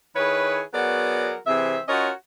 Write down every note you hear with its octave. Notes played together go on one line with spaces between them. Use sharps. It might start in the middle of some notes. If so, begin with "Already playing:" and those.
D#3 E4 G#4 B4 C#5
F#3 B3 F#4 G#4 A#4 D5
C3 E3 C4 G#4 E5
C#4 F4 F#4 A#4 C#5 D#5